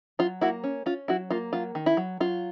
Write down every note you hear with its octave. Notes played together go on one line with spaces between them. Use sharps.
F#3 F4
A#3 E4 F#4
C#4
C#4 F4
F#3 E4 F#4
A#3 F4
F#3 F4
D#3
E4
F#3
F#3 F4